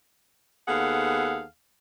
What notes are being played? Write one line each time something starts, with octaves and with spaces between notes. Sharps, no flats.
D#2 B3 G#4 A4 F5 F#5